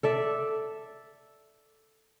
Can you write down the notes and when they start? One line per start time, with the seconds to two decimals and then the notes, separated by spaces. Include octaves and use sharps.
0.03 A4 D5 E5